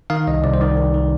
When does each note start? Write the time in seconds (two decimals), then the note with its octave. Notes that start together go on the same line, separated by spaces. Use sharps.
0.10 D#3 F5
0.27 C2 D#5
0.44 C2 D5
0.54 C5
0.61 D#3 D5
0.77 D#3
0.94 D#3